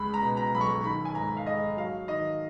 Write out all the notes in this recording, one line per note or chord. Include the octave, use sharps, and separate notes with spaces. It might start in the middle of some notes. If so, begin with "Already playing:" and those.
Already playing: C#2 C#3 G#3 B5
A#5
B2
A#5
B1 B5
C#6
D#3 B5
G#5
G#2 A#5
F5
G#3 D#5
F#3 F5
D#3 D#5